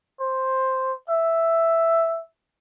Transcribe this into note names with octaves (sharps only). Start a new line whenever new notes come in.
C5
E5